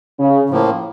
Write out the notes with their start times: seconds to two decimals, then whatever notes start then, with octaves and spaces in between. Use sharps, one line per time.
0.19 C#3
0.50 A2 F3 A#3